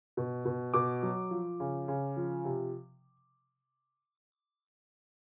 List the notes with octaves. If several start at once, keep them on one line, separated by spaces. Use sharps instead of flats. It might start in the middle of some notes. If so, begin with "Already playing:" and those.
B2
B2
B2 D6
F#3
F3
C#3
C#3
F3
C3